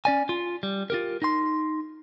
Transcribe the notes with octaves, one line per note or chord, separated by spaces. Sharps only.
C#4 D5 G#5
F4
G3
F4 G4 A#4
D#4 C6